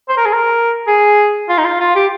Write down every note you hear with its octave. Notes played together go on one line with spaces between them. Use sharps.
C5
A#4
G#4
A#4
G#4
F4
D#4
F4
F4
G4